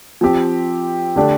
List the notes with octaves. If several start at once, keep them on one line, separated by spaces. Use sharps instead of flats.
F3 C4 G4
D3 A3 D4 G4